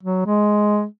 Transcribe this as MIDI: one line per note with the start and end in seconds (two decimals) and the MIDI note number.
0.03 0.22 54
0.26 0.85 56